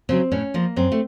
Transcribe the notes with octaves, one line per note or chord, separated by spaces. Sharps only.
C#3 F#3 C4
A2 C#4
F3 A#3
F#2 C4
A3